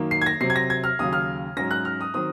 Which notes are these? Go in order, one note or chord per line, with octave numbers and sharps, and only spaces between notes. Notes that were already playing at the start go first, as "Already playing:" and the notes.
Already playing: F#2 D#3 A#3
C7
G#6
A#6
C3 F#3 C4 C7
G#6
A#6
G#6
F6
D#2 C#3 F#3 D#6
F6
G#2 F#3 C#4 A#6
F#6
F6
D#6
D#3 F#3 C4 D#6